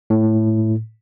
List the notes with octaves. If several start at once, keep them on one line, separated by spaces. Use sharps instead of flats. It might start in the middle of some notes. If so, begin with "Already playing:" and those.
A2